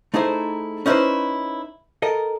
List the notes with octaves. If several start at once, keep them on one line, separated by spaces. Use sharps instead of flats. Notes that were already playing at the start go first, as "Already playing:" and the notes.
A3 D#4 E4 G#4 C5
C#4 D#4 E4 G4 B4 C5
A4 A#4 D#5